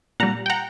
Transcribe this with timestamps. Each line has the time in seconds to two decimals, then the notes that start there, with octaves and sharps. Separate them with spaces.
0.20 A#2 G3 F#5 A#5
0.46 G5
0.50 F#5 A#5